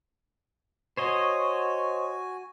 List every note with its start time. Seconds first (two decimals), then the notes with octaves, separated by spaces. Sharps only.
0.97 F#4 C5 C#5 D#5 G#5